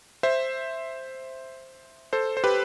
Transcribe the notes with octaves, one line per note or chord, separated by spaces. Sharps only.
C5 E5
A4 C5
C5
G4 B4